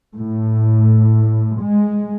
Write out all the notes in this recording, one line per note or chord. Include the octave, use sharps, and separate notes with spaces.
A2
G#3